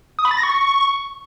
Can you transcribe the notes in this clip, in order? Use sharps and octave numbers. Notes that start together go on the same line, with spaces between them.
D#6
B5
A6
A#6
C#6